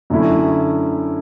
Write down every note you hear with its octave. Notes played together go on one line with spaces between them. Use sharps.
F#2 D3 A3 C#4 E4